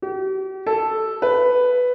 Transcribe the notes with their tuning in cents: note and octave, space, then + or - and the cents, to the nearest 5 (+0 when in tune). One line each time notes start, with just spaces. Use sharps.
G4 -45
A4 +0
B4 +5